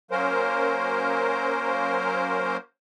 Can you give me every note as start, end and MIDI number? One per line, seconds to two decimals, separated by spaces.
0.11 2.57 54
0.11 2.57 58
0.11 2.57 61
0.11 2.57 70
0.11 2.57 72